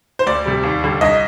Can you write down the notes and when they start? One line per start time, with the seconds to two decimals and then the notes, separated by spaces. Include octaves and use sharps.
0.19 C5
0.27 D2 D5
0.45 C3 G3
0.63 D#2
0.83 D3 G3
1.01 C2 D#5